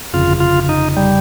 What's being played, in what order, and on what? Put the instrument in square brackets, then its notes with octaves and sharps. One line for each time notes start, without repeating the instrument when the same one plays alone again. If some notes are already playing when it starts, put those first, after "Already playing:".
[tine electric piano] G1 F2 C#3 [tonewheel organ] F4
[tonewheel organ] F4
D#4
G3